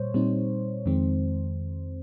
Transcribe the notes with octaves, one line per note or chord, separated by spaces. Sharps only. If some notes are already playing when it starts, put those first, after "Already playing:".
Already playing: A#2 G3 C5 C#5
A#2 G3 C4 D#4
F2 D#3 G#3 C4